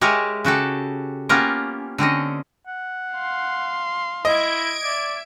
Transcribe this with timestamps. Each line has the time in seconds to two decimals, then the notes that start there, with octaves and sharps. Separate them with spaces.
0.01 G#3 G4 A#4 C#5 E5 G#5
0.45 C#3 F#4 G4 A4
1.29 A#3 B3 C#4 F4 G4 A#4
1.98 D3 C4 C#4 D#5
2.67 F#5
3.14 F5 C6
4.25 E4 D#5 G#6 D7
4.84 D5 E5